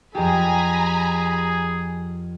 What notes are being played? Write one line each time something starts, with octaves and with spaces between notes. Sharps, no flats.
F2 G4 G#4 G#5 A#5 B5